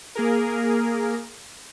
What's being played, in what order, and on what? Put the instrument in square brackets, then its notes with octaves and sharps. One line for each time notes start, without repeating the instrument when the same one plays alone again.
[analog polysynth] A#3 G#4 A#4